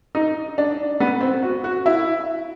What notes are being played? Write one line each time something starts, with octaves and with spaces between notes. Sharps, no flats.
D#4
D4
B3
C4
F#4
F#4
E4